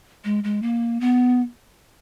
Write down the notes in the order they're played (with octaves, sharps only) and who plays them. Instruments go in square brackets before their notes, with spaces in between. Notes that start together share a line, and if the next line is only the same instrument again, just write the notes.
[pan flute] G#3
G#3
A#3
B3